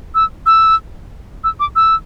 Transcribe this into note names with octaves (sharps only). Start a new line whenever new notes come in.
E6
E6
E6
D6
E6